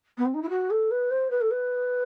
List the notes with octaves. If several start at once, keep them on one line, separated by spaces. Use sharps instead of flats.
B3
C4
D#4
E4
F#4
A4
B4
C5
B4
A4
B4